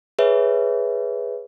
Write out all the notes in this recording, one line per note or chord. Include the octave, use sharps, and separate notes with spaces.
G#4 B4 C#5 E5